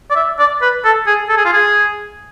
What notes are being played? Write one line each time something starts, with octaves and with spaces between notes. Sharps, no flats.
D5
E5
D5
B4
A4
G#4
A4
G#4
F4
G#4